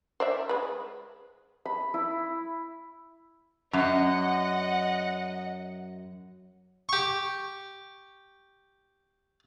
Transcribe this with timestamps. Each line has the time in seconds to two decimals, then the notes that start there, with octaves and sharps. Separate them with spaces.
0.20 C5 D5 E5
0.49 G#3 B4
1.65 B5
1.94 E4
3.73 F#2 D#5 F#5
6.89 G4 C#6